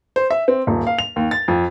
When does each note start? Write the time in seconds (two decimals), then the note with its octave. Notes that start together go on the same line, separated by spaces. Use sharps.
0.16 C5
0.31 E5
0.48 C4
0.67 D#1
0.87 F5
0.99 F7
1.16 D#2
1.31 A6
1.48 F2